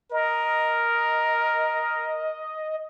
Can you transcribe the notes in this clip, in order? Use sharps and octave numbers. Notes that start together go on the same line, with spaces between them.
A#4 D#5